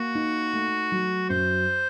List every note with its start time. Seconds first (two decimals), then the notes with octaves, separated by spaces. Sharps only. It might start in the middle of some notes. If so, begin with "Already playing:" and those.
Already playing: A#3 F#4
0.15 D#4
0.53 A3
0.92 F#3
1.30 F#2 C5